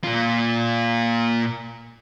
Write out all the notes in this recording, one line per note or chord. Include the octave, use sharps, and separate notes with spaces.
A#2 F4